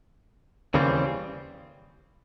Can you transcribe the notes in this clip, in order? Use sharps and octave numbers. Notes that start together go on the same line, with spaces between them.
D#2 C#3 E3 G3 C4